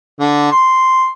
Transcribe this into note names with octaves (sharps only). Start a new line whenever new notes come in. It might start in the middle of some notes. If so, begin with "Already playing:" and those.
D3
C6